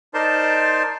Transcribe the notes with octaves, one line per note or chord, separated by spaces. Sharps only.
D#4 A#4 C5 D5 A5 C6